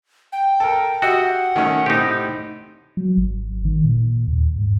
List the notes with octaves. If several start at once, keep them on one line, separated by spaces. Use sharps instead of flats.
G5
A4 A#4
F#4 G4 D#5 E5 F#5
D#3 A3 C#4
A2 C3 D#4 G4
F#3
G#1
D#3
A#2
D#2
G#2